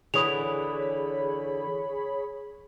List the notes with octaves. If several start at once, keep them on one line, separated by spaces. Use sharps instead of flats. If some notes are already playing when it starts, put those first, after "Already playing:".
D3 E3 G#4 C#5 B5 D#6 F7